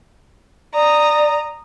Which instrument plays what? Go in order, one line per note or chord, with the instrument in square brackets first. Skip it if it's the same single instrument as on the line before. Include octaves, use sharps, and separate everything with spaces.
[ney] D5 [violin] A#5 D#6